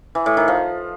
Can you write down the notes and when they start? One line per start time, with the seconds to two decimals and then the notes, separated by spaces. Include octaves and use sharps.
0.15 E3
0.26 A2
0.37 D#3
0.48 F3